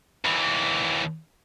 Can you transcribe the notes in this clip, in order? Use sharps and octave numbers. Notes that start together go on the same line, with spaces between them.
D#2 E3